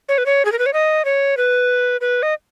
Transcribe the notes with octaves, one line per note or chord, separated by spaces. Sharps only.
C#5
B4
C#5
G#4
A#4
B4
C#5
D#5
C#5
B4
B4
D#5